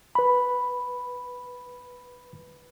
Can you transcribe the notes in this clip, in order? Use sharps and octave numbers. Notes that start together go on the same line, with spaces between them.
B4 B5